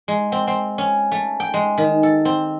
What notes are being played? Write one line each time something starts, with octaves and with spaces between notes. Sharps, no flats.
G#3
C4
C4
C#4
A3
G5
G#3
D#3
A4
C4